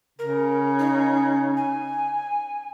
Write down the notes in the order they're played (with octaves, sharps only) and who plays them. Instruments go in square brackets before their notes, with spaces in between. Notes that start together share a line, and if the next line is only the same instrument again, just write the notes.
[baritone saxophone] C#3 [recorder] A#4
[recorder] D#4
G#5